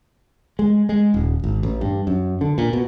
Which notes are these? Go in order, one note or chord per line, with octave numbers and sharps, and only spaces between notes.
G#3
G#3
D#1
G#1
A1
G2
F#2
D3
A#2
B2